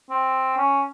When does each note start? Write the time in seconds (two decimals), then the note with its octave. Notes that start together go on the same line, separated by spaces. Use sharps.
0.10 C4
0.57 C#4